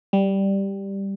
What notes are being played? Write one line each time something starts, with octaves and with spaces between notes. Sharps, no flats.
G3